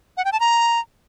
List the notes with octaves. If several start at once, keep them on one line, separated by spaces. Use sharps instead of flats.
F#5
G5
A5
A#5